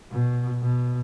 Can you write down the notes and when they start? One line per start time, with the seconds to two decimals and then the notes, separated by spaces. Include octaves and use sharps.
0.11 B2
0.62 B2